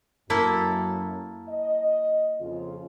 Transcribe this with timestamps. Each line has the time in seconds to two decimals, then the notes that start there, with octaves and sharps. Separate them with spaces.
0.30 F#2 A#3 E4 A4
1.49 D#5
2.41 F2 C#3 F4